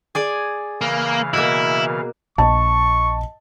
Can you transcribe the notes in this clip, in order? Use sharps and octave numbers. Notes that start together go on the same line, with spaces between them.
G#4 D5 G#5
C#3 E3 A#3 F5
B2 A#3 E4
A#1 D#5 A5 C#6